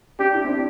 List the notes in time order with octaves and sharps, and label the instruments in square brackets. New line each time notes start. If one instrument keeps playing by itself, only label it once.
[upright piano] D4 [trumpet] G4
[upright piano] E4
C4
D4